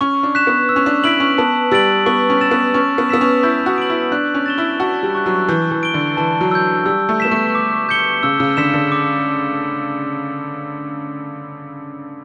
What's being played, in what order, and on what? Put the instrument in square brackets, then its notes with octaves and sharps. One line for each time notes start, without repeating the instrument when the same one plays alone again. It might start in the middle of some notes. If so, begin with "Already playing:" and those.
[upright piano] C#4 [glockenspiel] C#6
[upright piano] D4
[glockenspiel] F#6 B6 E7
[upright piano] B3
[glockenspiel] E6
[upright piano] C#4
D4
[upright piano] E4 [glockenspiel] B6 D7 F#7
[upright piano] C#4
[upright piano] B3 [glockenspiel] A5
[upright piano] G3 [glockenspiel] E6 A6 D7 F#7
[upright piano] B3 [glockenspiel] C#6
[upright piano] C#4
[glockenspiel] E6 A6 E7
[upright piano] B3
[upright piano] C#4 [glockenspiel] C#6
[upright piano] B3
[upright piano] B3 [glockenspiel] E6 B6 E7
[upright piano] C#4
[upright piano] E4 [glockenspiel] G6
[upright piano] F#4
[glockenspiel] D7 F#7
[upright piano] E4
[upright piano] D4 [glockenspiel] F#6
[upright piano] C#4
[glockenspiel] A6 E7 G7
[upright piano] E4
[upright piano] F#4 [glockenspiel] A5
[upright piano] G3
[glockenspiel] C#6 F#6
[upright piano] F#3
[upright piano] E3 [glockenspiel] G6
[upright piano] E3
[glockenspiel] D7 G7
[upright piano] D3
[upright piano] E3 [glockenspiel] A5
[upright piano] F#3
[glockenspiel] E6 G6
[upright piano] G3 [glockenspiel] E6
[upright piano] A3
[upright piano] B3 [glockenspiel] B6 E7
[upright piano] A3
[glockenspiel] D6
G6 C#7 G7
[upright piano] C#3 [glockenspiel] E6
[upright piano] C#3
[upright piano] D3 [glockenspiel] B6 E7
[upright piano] D3
[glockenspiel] D6